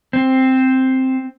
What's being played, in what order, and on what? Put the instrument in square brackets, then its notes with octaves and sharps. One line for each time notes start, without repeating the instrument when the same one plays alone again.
[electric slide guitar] C4